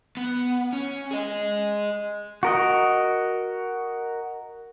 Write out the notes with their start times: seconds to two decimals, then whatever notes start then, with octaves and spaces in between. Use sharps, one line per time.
0.17 B3
0.73 C#4
1.11 G#4 D#5
2.43 F#4 A#4 D#5